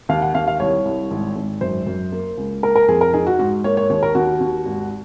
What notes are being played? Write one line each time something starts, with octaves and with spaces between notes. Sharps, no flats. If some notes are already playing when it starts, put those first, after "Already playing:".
D#2 F5
F#5
D#2 F5
F5
C2 C#5
C2
G#1
G#1
F#2 C5
F#2
A#3
C#2
A#3 A#4
A#4
F2 G#4
A#4
D#4 G#4
F#4
G#2 F#4
A#3 C#5
C#5
D#2 C#5
A#4
D#2 F#4
D#2
G#1